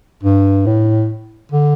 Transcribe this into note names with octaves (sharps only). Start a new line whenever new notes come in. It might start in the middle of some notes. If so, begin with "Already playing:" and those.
G2
A2
D3